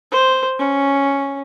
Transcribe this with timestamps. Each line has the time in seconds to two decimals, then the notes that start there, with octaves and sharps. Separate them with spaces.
0.12 C5
0.59 C#4